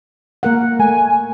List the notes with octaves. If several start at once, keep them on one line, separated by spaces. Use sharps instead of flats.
A#3 A#4 F#5
A3 G#5